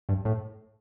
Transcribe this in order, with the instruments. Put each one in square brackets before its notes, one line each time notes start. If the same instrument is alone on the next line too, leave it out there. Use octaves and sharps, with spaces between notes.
[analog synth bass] G2
A2